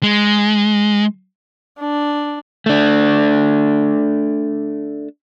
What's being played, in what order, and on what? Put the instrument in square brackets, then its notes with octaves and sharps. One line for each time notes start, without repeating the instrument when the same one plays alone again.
[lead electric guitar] G#3
[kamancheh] D4
[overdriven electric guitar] A3 D4